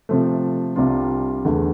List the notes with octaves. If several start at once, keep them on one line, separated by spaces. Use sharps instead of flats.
C3 F3 A3
C2 C3 G3 D4 F4
E2 D3 A3